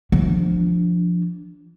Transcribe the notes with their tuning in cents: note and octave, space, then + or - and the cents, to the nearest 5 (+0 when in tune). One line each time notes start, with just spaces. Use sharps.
F3 +0 D4 +0